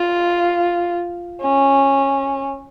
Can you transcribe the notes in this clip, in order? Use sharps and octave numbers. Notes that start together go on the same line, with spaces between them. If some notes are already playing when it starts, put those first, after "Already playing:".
Already playing: F4
C#4